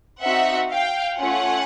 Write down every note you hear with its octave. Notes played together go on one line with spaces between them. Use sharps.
C4 D#4 F#4 E5 F#5
F5 G5
A3 C#4 F4 F#5 G#5